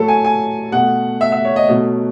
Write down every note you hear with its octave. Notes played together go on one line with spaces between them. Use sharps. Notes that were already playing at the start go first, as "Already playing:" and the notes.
Already playing: A2 F#3 A3 A4
G#5
G#5
B2 A3 F#5
E5
E5
C#5
D#5
B2 F#3 A3